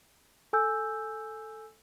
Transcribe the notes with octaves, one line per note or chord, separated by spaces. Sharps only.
A4 G#5 E6 G6